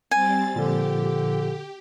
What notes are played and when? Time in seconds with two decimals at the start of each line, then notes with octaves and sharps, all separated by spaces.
0.11 G3 C4 G#5 A6
0.56 A#2 D3 F3 G4